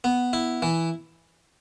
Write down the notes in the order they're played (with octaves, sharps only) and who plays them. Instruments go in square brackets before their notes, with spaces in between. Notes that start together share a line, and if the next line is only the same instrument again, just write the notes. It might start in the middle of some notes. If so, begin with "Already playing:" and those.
[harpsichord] B3
E4
E3